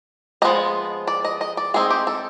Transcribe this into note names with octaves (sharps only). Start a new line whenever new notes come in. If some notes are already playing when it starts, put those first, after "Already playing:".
F3 G#3 B3 D#4 D#5
D5
D#5
D#5
D5
G#3 C4 D#4 G#4
G4
A4